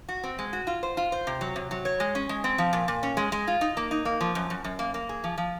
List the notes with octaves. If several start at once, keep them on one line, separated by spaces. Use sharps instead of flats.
F#4
C4
G#3
F#4
F4
C5
F4
C5
C3
F#3
C3
F#3
C#5
G#3
C#4
G#3
C4
F3
A#2
A#2
C#4
G#3
G#3
F4
D#4
A#3
D#4
A#3
F3
F#2
F#2
F#2
A#3
A#3
G#4
F3
F3